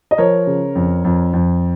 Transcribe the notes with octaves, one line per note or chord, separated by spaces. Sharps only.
D#5
F3 A#4 C#5
C#3
F2
F2
F2